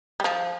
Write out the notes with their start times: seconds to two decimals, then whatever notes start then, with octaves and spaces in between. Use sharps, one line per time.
0.20 G3
0.24 F3